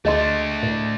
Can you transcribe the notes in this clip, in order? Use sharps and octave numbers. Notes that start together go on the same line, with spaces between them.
D2 A3 D4 G#4 D#5 C6
A2